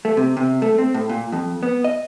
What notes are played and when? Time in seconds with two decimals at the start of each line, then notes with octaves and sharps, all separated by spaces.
0.05 A3
0.17 C3
0.37 C3
0.62 A3
0.78 C4
0.94 A2
1.09 A#2
1.32 F2
1.63 B3
1.84 D#5